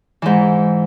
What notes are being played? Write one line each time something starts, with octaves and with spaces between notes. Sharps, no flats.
G#2 E3